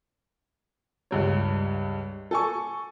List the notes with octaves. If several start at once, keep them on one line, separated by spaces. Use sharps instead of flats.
C#2 G2 C#5
A4 G#5 C#6